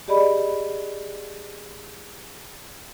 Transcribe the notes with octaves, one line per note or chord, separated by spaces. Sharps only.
G4 G#4 D5 D#5 B5